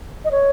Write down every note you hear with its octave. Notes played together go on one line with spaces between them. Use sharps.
D#5
C#5